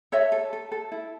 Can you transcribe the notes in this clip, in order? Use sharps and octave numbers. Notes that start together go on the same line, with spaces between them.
A4 C#5 E5
A4
A4
A4
E4